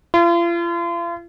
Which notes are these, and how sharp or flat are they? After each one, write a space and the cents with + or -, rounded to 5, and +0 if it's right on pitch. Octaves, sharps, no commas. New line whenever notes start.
F4 -40